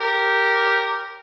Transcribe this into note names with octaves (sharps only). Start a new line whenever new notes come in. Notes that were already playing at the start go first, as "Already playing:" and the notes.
G4 A#4